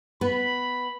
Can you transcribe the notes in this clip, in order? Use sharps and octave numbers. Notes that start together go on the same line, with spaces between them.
B3 B4 B5